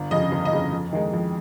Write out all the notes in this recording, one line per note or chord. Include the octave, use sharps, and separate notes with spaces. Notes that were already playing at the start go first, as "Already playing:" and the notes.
Already playing: G1
F2 C#3 D#5
G1
D#5
F2 C#3
F2
D#3 G#3 D#4
F2